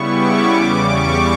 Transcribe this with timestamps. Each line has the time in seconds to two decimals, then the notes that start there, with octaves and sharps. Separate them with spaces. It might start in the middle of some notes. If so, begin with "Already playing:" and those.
Already playing: C#3 G3 B3 E4 C#6
0.12 D6
0.50 E2 C#3 G3
0.87 C#6